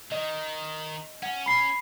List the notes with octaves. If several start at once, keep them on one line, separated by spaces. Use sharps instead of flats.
D#3 D#5
C#4 F#5
B5 C7